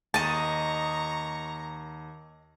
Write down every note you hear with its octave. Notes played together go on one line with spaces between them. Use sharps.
D#2 D#5 A5 A#5 C#6 D#7